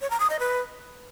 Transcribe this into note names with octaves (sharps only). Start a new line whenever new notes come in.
C#5
A#5
D#6
D#5
B4